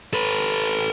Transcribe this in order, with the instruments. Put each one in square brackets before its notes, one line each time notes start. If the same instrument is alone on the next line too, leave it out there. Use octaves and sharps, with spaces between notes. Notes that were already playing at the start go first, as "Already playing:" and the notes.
[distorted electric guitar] A4 B4